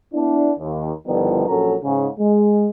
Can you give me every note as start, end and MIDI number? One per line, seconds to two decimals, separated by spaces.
0.13 0.52 59
0.13 0.52 62
0.13 0.52 64
0.58 0.90 39
1.06 1.47 31
1.06 1.47 51
1.06 1.47 53
1.06 1.47 55
1.06 1.47 59
1.06 1.47 64
1.47 1.74 34
1.47 1.74 54
1.47 1.74 61
1.47 1.74 69
1.47 1.74 70
1.47 1.74 82
1.83 2.07 44
1.83 2.07 49
2.18 2.68 56